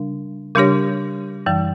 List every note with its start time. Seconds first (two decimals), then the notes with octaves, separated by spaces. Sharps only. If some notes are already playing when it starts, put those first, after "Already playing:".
Already playing: C#3 G3 D4
0.55 C#3 G3 D4 G4 C#5
1.46 F#2 E3 G3